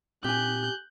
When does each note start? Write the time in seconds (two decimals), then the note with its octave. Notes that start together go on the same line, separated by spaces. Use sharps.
0.24 A#2 C4 G4 G#5 F#6 G6